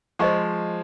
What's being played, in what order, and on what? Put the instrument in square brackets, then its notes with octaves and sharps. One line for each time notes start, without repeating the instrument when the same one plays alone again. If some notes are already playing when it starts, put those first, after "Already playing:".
[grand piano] F3 G#3 [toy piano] C5 D#5 G#5 C#6